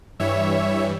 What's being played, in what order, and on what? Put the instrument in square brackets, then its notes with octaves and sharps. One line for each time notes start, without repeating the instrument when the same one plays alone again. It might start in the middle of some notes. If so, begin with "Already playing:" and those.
[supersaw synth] G2 E3 G3 C#5 E5